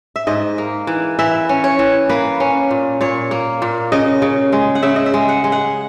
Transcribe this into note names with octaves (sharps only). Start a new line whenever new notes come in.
E5
G#2 D#5
A#3
E3
E3 E5
C#4
C#5
E3
A#3 B4
C#4
A#2
A#2 C#5
A#3
A#2
C#3 D#5
C#3
G#3
F#5
C#3 E5
D#5
E5
G#3
F#5
G#3
F#5